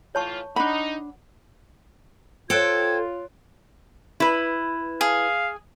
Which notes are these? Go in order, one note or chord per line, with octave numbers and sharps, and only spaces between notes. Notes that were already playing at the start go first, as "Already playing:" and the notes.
A2 E3 F4 C#5 A5 C#6
D4 D#4 F#5 B5
F4 A4 C5 C#5 G5 F#6 G#6 D7
E4 B4
G#4 F5